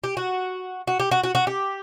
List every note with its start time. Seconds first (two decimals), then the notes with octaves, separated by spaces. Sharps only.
0.04 G4
0.17 F#4
0.87 F#4
1.00 G4
1.11 F#4
1.24 F#4
1.35 F#4
1.47 G4